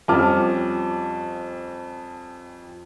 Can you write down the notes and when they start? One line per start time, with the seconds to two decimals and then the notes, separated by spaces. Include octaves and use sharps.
0.08 F2 F3 G3 C#4 D6 F6